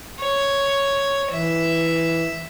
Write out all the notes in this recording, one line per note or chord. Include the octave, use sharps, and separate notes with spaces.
C#5
E3 E5